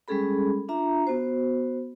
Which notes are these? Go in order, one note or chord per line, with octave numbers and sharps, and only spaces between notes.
G3 G#3 C#4 G#4 A4 B5
D4 F4 E5 A#5
B3 F#4 C5